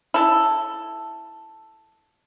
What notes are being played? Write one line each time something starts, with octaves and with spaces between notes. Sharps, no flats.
E4 A4